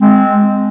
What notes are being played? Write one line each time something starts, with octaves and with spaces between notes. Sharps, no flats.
G#3 C4